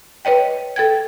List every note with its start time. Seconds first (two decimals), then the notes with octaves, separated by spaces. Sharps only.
0.25 B4 C#5 D#5 G5
0.76 A4 G5 G#6